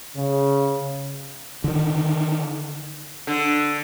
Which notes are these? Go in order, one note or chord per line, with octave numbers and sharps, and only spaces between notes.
C#3
D3 D#3
D3